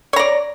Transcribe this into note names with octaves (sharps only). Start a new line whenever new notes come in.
C#5 D5 A#5